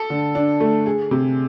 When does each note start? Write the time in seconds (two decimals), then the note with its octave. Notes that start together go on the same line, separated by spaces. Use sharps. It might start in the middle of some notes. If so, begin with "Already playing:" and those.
Already playing: A4
0.10 D3
0.35 D4
0.60 A3
0.86 G#4
1.11 C3